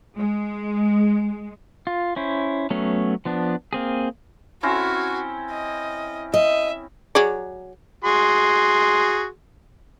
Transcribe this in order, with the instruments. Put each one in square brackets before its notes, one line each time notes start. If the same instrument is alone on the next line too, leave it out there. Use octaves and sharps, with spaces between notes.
[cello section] G#3
[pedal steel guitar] F4
C#4 E4 C5
F#3 A3 B3 C#4
F3 B3 D4
A#3 C4 G#4
[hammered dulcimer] C4 C#4 E4 [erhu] F#4
[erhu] D#5
[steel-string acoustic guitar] D#5 [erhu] E5
[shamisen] F#3 G#4 D5
[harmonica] F#4 G#4 C6